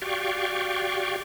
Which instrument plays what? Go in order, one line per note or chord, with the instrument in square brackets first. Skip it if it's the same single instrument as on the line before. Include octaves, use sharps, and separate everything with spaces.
[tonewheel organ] F#4 G4 D5 F5 G5 C#6